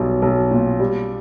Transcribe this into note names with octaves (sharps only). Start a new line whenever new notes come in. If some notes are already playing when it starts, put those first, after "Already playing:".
Already playing: B1 G3
B1
A#2
G3